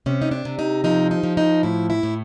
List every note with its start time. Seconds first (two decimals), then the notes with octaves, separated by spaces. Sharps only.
0.06 C3 C#4
0.22 D#4
0.31 D4
0.45 C3
0.59 D#4
0.84 F3 D#4
1.11 D#4
1.23 F3
1.37 D#4
1.63 A2 E4
1.90 E4
2.03 A2